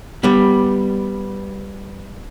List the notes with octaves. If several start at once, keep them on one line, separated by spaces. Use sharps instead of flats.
G3 B3